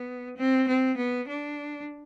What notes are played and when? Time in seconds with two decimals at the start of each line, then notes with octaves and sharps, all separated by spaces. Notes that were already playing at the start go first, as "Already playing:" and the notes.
Already playing: B3
0.37 C4
0.68 C4
0.97 B3
1.28 D4